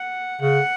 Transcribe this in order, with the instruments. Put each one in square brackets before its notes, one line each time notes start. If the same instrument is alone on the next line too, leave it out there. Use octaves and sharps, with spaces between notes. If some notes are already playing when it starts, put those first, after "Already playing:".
Already playing: [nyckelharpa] F#5
[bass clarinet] C#3 [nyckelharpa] F#5